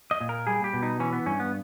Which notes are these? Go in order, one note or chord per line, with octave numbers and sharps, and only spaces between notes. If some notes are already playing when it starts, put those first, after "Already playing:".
D#5
A#2
A#4
G3 G#4
G4
B2
D#4
E3 C#4
B3
G2 C#4
B3